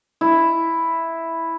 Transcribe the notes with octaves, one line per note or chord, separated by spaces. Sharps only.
E4